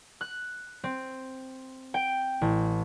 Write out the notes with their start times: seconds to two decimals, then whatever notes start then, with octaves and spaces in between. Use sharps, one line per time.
0.21 F#6
0.84 C4
1.94 G5
2.41 A1